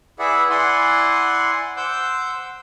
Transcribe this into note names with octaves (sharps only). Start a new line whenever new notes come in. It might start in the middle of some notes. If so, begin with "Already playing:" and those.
E4 G#4 B4 D5 E5 F#5
E4 D5 F#5 G#5 C6
C5 F#5 D6 E6 G6